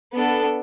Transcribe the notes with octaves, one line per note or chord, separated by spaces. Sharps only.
B3 D4 A4